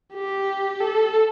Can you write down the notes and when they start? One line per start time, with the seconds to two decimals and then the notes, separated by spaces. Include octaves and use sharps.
0.14 G4
0.81 A4